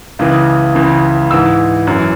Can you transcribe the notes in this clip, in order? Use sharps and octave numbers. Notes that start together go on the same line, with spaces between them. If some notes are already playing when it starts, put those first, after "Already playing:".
C#2 C#3 E3
C#2 C#3 E3
G#2 E3 E6
F#2 E3